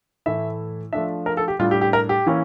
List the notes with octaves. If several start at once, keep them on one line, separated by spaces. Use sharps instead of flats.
A2 E3 A3 E4 E5
F3 A3 D4 E5
A#4
A4
G4
A2 G3 D4 F4
G4
G4
A#4
G4
E3 A#3 C#4 E4